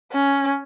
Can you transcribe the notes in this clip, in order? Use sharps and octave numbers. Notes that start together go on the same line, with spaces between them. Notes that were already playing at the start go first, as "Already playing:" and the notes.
C#4